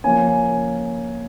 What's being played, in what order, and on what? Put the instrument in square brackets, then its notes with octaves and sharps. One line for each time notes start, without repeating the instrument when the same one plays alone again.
[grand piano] F3 A#3 C#4 G#5